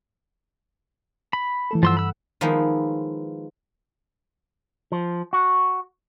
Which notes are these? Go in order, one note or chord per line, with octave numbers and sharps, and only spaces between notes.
B5
E3 A3 A4
G2 F3 F#5 C6 E6
B5 E6
D#3 F3 G#3 A#3 B3 E4
F3
F#4